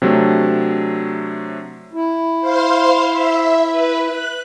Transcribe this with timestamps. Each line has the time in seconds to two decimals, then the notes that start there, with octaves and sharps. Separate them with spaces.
0.02 C3 F#3 A3 D4
1.93 E4
2.41 C5 F5 C6
3.11 E5
3.71 B4
4.03 F#6